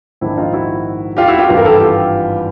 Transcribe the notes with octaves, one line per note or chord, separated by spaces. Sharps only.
A#1 G#2 D#3 D4 E4
D#4 F4
E4 F#4
F4 G4
E4 F#4
F4 G4
G#1 G2 E3 F4 G4
A#4
G4 A4
F4 G4